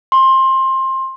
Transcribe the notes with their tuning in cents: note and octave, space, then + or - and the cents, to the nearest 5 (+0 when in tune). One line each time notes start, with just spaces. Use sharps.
C6 +20